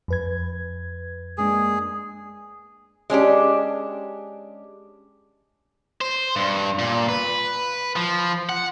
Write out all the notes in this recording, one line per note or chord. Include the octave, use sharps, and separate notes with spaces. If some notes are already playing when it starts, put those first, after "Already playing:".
F2 B4 G#6
G#3 A#3 D4 G#4
G#3 C#4 D4 G4
C5
G2
A#2
B4
F3
F#5